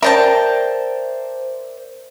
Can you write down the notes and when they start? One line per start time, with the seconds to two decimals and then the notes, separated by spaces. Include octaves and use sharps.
0.02 A#4 C5 D5 E5 G5 A5